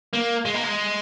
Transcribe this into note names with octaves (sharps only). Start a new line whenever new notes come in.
A#3
G#3
A#3
G#3